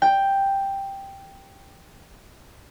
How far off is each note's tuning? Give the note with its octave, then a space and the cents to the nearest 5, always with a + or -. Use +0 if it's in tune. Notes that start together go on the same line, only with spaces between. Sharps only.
G5 +5